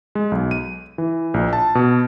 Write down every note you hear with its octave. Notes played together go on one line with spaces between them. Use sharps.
G#3
B1
D#7
E3
A#1
A5
B2